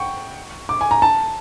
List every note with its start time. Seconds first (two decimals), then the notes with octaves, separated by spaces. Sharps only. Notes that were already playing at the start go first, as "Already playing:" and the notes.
Already playing: F#5 G5 C#6
0.69 D6
0.81 G#5
0.91 A#5
1.02 A5